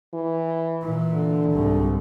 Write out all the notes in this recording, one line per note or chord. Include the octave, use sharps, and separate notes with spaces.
E3
A#2 E3
D3
C2 G#2